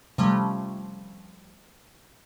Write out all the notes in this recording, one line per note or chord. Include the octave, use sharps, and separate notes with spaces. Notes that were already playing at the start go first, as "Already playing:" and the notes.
C3 F3 G3 A3 C#4